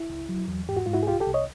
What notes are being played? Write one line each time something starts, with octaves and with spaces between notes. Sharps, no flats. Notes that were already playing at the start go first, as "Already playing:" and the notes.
Already playing: E4
C#2
F#3
E2
G#2 G4
F#4
G#2 F4
E4 F#4
G#4
C2 F4 G4
G4 A4
C2
C#5 D#5